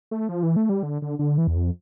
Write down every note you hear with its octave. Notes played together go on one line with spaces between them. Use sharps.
A3
F3
E3
A3
G3
D3
D3
D3
E3
E2
F2